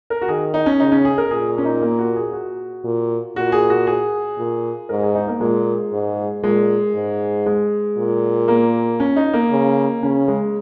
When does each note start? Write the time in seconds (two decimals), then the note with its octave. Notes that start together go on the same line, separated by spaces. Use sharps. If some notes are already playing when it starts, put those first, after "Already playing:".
0.10 A#4
0.22 F#4
0.28 D#3 G#4
0.54 D#4
0.66 C#4
0.80 C#3 D#4
0.92 C#4
1.05 G#4
1.18 A#4
1.31 A#2 G#4
1.58 C#4
1.65 D#4
1.81 A#3
1.99 F#4
2.16 G#4
2.33 F#4
2.84 A#2
3.36 A#2 F#4
3.52 G#4
3.70 F#4
3.87 G#4
4.38 A#2
4.89 G#2 A#4
5.03 G#4
5.15 D#4
5.28 A#3
5.40 A#2 G#3
5.92 G#2
6.43 A#2 G#3
6.94 G#2
7.46 G#3
7.97 A#2
8.48 A#3
9.00 C#4
9.16 D#4
9.33 A#3
9.51 C#3
10.02 C#3 C#4
10.28 G#3